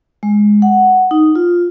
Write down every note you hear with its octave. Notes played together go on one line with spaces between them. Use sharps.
G#3
F#5
D#4
F4